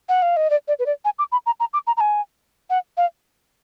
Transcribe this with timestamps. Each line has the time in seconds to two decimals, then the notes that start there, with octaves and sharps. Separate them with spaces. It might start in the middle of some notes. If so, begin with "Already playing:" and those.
0.09 F#5
0.22 F5
0.37 D#5
0.50 D5
0.68 D5
0.79 B4
0.86 D5
1.05 G#5
1.19 D6
1.32 B5
1.46 A#5
1.60 A#5
1.73 D6
1.87 A#5
1.97 A#5
2.00 G#5
2.70 F#5
2.97 F5